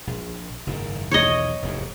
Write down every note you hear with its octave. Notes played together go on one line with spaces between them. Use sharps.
A#1
F#1 G#2 D#3
B1 E2 D#3 C#5 D#5
F1 E2 G#2